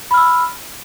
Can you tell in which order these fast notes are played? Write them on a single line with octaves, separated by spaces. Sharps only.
B5 F6 E6